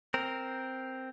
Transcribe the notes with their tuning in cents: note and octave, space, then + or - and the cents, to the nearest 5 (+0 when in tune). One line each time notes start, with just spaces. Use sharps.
C4 +0 A#4 +0